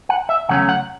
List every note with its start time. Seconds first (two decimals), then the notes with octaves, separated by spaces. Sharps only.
0.09 F#5
0.29 E5
0.49 E2 C#3 F#3 A3 C#4 F#5
0.69 F#5